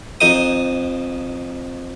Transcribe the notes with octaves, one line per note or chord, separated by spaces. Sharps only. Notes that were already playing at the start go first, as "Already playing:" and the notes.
F2 D#4 C5 D#6